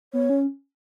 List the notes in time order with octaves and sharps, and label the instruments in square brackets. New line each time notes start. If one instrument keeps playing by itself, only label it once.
[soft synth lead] B3 [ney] C#5
[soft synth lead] C#4